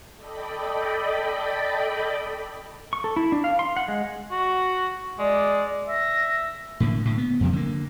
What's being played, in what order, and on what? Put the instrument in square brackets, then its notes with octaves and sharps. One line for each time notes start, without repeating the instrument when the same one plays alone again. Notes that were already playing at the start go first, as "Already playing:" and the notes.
[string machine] A4 D5 D#5 G5 B5
[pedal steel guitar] C#6
A4
E4
D4
F5
C6
F#5
G#3
[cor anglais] F#4
[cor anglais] G#3 [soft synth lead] D5
[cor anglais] E5 [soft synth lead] A#6
[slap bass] A2 D3 A#3
A2 D3
B3
F2 C3 F#3
D3 A#3